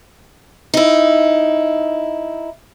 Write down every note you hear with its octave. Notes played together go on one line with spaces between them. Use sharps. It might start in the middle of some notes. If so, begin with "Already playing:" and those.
D#4 E4